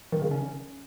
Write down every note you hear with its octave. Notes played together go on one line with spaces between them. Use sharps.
D#3
C#3
C#4